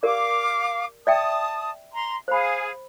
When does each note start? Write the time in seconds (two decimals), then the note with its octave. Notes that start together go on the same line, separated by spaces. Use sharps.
0.03 G4 A#4 D5 F5 D6
1.07 D5 E5 G5 A5 D#6
1.92 A#5 C6
2.28 G#4 C5 F5 B5